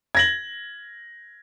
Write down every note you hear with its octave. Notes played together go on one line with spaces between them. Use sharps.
G#6 A#6 F#7